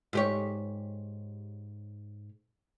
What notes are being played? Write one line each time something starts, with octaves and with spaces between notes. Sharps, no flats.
G#2 G4 C#5